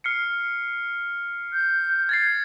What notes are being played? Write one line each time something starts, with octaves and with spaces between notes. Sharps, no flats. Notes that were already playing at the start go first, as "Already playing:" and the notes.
F6 C7 C#7
G6
G#6 A6 C7